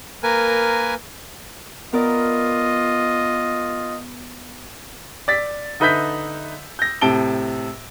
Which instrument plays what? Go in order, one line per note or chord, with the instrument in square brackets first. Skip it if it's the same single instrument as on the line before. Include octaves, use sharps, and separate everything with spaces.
[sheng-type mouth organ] A#3 A#4 B4 G#5
[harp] B3 A#4 D5 [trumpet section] F4 D#5
[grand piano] D5 A6 B6
D3 D#4 B4 E5 G6 B6
G6 A#6
A2 C3 A5 D7 G7